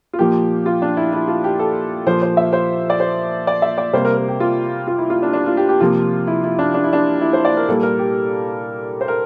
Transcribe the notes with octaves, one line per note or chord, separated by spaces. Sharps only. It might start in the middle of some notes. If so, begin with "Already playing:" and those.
F4
A#2 F3 A#3 G4
F4
D4
E4
E4
F4
G4
A4
A#2 F3 A#3 C5
C5
E5
C5
D5
C5
D5
E5
D5
C3 G3 A#3 C5
A#4
A#4
G4
F4
F4
E4
F4
D4
D4
F4
G4
G4
C3 F3 A#3 F4
E4
E4
D4
D4
E4
D4
E4
C5
D5
A#4
A#2 G3 A#3 A4
A#4
G4
C5
A#4